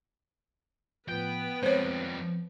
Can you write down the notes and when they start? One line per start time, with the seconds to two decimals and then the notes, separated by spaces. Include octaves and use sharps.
1.08 A2 F3 B3 B4 G5
1.63 F2 G3 G#3 C4 C5 C#5